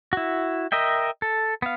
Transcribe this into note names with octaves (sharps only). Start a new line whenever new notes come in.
E4 F#4
A#4 D#5 E5 G5
A4
B3 F5